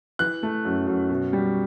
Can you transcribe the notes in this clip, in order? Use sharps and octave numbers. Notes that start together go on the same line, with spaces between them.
E3 F#6
A3
F#2
F#2
B2
G3